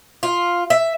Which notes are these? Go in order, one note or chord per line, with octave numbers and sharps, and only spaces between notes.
F4
E5